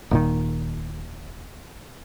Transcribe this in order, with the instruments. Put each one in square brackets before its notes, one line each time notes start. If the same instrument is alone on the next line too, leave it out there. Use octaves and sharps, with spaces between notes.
[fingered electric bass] D#1 A#2 D#3